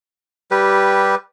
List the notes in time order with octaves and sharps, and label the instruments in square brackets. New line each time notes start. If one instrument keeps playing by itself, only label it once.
[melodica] G3 G4 B4